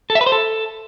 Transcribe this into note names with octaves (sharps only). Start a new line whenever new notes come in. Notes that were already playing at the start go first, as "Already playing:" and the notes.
A4
E5
B4
C5
A4